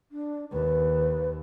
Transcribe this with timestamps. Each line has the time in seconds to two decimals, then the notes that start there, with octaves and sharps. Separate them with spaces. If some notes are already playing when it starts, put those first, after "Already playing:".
0.11 D4
0.52 D#2 B4